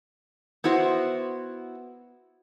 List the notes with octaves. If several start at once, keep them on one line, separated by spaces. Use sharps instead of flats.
B3 E4 F#4 C5